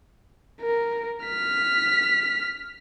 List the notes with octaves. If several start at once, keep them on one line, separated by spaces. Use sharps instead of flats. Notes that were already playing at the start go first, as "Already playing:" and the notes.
A#4
F6 B6